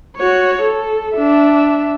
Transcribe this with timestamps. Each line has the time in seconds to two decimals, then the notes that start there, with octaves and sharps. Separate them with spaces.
0.17 F#4 C#5
0.62 A4
1.15 D4 E5